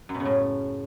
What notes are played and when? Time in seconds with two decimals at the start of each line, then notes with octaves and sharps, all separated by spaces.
0.09 F#2
0.14 B2
0.20 C#3
0.25 A2